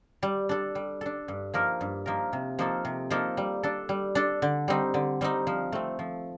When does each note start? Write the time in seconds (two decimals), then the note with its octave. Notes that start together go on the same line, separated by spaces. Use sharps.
0.23 G3
0.49 D4 A4
0.75 G3
1.01 D4 A4
1.28 G2
1.54 F3 A#3 D#4 A#4
1.81 G2
2.06 F3 A#3 D#4 A#4
2.33 C3
2.59 F3 A#3 D#4 A4
2.85 C3
3.10 F3 A#3 D#4 A4
3.37 G3
3.63 D4 A4
3.89 G3
4.15 D4 A4
4.42 D3
4.68 G3 C4 D#4
4.94 D3
5.21 G3 C4 D#4
5.47 F3
5.72 A3 C4
5.99 F3